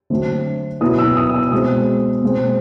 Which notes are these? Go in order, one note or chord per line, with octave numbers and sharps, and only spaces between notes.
D3 F#3 A3 C4
B2 F#3 B3 E4 D#6
E6
D#6
E6
B2 G#3 C4 D#6
B2 G#3 C4